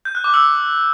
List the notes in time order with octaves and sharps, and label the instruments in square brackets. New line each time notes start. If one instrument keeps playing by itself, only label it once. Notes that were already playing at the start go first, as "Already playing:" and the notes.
[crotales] G6
F#6
D6
E6